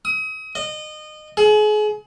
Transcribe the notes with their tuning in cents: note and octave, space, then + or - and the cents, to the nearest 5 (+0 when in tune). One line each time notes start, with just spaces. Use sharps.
D#6 +35
D#5 -25
G#4 +35